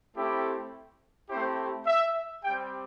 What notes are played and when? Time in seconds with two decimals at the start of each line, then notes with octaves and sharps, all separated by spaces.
0.14 A3 C4 E4 G4 A4
1.29 A3 C4 E4 G4 C5
1.87 E5
2.43 G3 C4 G4 G5